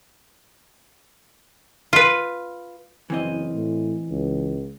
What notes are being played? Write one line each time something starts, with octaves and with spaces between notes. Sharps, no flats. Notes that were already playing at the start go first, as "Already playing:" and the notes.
F4 B4
F#1 E3 C4 D#5
A2
C#2